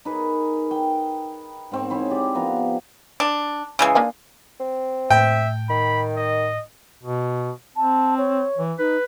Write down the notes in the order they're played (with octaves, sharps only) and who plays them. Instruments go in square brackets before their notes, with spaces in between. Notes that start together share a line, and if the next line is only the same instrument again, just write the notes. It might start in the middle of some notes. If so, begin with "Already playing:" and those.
[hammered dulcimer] D#4 G#4 A#4 B4
G5
G#2 C4 C#6
C4 E4 G#4 C#5
G4 D5
F3 B3 A#5
[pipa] D4
C#3 E3 G#3
[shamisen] A#3 D4 G#5
[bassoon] C4
[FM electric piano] A2 [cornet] E5 [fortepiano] G5
[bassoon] D#3 [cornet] B5
[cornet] D#5
[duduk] B2
[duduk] C4 [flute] A5
[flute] C#5
[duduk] E3
[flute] D#4 [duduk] B4